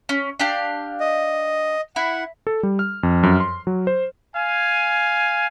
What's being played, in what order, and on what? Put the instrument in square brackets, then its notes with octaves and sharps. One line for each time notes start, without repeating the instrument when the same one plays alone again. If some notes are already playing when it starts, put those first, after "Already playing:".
[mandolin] C#4
D4 G4 F5
[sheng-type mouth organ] D#5
[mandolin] E4 [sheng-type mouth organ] F#5
[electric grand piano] A4
G3
F6
F2
F#2
C6
F#3
C5
[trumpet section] F5 G#5